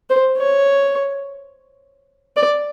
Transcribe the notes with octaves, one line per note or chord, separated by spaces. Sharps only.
C5
C#5
D5